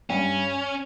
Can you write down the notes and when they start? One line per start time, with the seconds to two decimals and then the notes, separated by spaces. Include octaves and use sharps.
0.10 G2 C#4